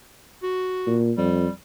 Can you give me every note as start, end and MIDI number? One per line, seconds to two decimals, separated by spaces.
0.43 0.98 66
0.87 1.12 46
1.18 1.46 41
1.18 1.52 55